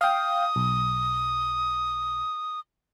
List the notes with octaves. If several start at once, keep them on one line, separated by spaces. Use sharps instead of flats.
F5 G5 D#6
B1